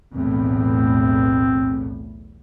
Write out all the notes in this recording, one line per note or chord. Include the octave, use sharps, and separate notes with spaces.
B1 E2 A2 C4